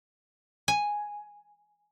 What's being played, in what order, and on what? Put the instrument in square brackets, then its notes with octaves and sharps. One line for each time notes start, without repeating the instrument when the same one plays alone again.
[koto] G#5